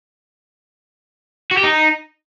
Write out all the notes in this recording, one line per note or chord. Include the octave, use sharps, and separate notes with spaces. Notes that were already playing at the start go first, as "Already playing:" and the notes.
F#4
G4
D#4